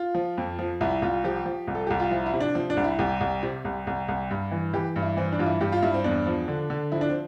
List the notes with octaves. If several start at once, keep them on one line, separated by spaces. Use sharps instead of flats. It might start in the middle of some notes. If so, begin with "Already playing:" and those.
Already playing: F4
F3
F2
F3
C2 E4
C2 F4
F3 G4
F3
C2
A4
C2 G4
F4
F3 E4
E4
C3
D4
F3 C4
D4
C2
E4
C2 G4
C2
C3
C2
C2
C2
G2
E3
E3 G4
G2
E4
E3 C4
D4
G2 F4
E4
G2 G4
F4
G2 E4
C4
E2 D4
F3
D3
D3
F3 E4
D4
C4